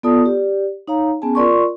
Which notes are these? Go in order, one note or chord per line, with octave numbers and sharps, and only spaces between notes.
B3 F4 A4 D5 A5 D#6
G4 D5
D#4 C#5 F5 A#5
B3 C#4 G#4 G#5 A5
F4 A#4 D5 C6 C#6